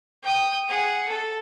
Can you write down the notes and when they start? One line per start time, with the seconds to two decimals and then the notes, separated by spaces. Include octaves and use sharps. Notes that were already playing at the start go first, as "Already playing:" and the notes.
0.22 G5 D#6
0.68 G#4 F#5
1.08 A4